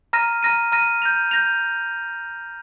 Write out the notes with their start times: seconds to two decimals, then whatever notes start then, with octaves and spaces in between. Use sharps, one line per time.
0.13 A#5 F6 A#6 D#7
0.43 A#5 F6 A#6 D#7
0.72 A#5 F6 A#6 D#7
1.02 G6 A#6 F7
1.31 G6 A#6 F7